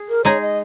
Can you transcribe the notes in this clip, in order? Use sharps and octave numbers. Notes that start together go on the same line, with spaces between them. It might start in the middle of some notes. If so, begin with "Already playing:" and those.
Already playing: G#4
A#4
G#3 D#4 G#4 C#5
D#5